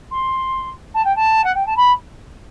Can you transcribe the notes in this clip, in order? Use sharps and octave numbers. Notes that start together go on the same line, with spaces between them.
C6
A5
G5
A5
F#5
G5
A5
B5